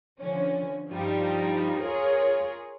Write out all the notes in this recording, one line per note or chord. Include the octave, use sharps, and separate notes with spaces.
D3 F3 C#4
G2 F3 G3 D#4
F4 G#4 A#4 C#5